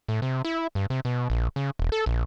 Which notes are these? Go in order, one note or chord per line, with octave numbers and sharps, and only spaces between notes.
A2
C3
E4
G2
C3
B2
A#1
C#3
E1
A4
A#1